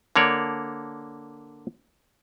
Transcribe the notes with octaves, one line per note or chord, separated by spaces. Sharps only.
D3 A#3 C#5 D5